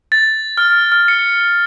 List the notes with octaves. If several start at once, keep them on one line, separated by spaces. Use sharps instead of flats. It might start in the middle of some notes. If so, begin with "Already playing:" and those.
A6
F6
F6
C#7